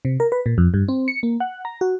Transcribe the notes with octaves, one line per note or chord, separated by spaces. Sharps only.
C3
A#4
B4
A#2
F2
G2
C4
C#7
A#3
F#5
A#5
F#4